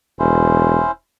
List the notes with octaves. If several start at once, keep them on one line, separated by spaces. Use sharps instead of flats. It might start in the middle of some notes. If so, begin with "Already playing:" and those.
E1 C#4 E4 C5